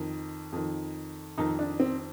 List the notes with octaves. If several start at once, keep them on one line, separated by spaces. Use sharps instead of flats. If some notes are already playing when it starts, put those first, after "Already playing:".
Already playing: F2 D#3
F2 D#3
F2 D#3 D#4
D4
C4